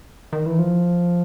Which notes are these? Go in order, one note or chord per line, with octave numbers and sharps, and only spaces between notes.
D#3
E3
F3